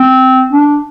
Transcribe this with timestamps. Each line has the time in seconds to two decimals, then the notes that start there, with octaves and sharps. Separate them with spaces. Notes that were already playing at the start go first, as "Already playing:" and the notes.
Already playing: C4
0.52 D4